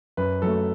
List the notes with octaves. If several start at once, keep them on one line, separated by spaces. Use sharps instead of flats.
F#2 B4
F#3 A3 A4